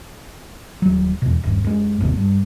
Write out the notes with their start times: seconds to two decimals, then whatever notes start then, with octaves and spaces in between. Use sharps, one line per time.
0.82 D#1 F#3
1.22 E2 B2
1.43 D#1 G2
1.64 F#2 G#3
2.00 G1 D#2 C3 C4
2.17 G2